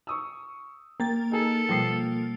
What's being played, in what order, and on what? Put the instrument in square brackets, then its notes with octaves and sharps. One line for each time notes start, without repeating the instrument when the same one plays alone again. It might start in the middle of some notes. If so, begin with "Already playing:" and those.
[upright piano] C#6 D#6 E6
[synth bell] A#3 A6 [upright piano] G5
[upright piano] D#4 G#4 [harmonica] A4
[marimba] B2 G3 [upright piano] F3 C7